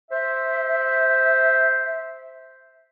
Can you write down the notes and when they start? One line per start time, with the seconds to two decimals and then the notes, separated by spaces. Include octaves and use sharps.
0.11 C5 E5